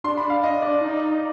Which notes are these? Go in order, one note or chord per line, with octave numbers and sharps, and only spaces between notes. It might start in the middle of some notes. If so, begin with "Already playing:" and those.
D4 C6
B5
F5
D#5
D5
D#4